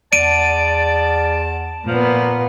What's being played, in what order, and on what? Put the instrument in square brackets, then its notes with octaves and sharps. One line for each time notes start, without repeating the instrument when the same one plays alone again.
[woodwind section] E2 A5 [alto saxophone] D5 [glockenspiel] D7 D#7
[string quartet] A#2 B3 [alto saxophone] F3